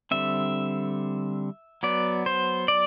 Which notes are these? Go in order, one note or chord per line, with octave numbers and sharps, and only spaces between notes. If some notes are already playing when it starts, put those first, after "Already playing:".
D3 G3 C4 E5
F#3 B3 D5
C5
D5